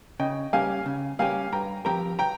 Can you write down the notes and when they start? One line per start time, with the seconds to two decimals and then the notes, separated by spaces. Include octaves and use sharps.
0.20 C#3 D#5 G5
0.53 G3 A#3 C#4 G4 F5 G#5
0.86 C#3
1.19 G3 A#3 C#4 G4 F5 G#5
1.52 G2 G5 A#5
1.85 F3 C4 G4 A#4 G5 A#5
2.19 G5 A#5